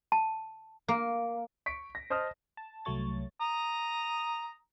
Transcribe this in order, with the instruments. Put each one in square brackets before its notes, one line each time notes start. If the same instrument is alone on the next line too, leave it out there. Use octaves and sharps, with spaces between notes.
[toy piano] A5
[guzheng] A#3
[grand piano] C#6 B6 D7
A#6
C5 D#5 A5 D#6 F6
[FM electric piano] A5
C2 F#3 A3 C#5 A6
[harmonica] A#5 D#6